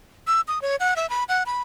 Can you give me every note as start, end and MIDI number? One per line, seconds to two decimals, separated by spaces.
0.27 0.41 88
0.48 0.61 87
0.62 0.76 73
0.80 0.94 78
0.96 1.09 76
1.10 1.24 83
1.29 1.43 78
1.46 1.62 83